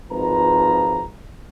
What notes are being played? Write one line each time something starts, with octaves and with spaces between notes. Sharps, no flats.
G#1 F3 B4 A#5